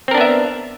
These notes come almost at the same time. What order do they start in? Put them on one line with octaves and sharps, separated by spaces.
C4 A#4 D4 B3 E5